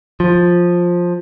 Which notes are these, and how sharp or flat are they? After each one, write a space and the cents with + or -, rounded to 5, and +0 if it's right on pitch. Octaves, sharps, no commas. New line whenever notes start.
F3 +10